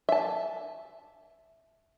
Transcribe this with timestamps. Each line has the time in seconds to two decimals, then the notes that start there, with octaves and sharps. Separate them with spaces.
0.09 E5 A5